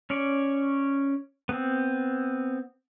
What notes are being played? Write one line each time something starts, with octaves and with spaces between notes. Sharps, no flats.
C#4 C#5 D5
B3 C4